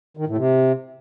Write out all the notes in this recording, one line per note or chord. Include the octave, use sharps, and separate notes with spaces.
D#3
A2
C3